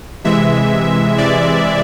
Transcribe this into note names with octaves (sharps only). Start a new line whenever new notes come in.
C3 E3 G#3 E5
C3 E3 G#3 D5